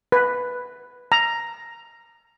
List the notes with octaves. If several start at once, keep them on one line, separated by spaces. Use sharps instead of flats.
B4
A#5